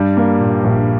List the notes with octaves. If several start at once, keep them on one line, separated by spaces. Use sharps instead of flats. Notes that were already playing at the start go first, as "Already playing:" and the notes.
Already playing: G2 G3
A#3
A#2
A#1